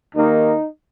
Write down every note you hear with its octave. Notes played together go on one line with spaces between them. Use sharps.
D#2 D#3 A#3 D#4